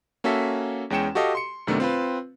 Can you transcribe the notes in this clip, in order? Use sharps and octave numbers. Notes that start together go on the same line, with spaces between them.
A#3 C#4 F#4 A4 E5 B6
E2 G#3 C#4 G5 C#7 E7
F#4 G4 A4 D#5 F5
C6 C#7
F#2 C3 D#3 A3 B3 D4
C4 F4 B4